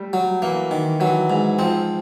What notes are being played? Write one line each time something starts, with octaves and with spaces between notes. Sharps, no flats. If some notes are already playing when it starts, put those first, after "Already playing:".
Already playing: G3 A3
F#3
E3 A#3
D#3
E3 F#3
G#2
F3 C4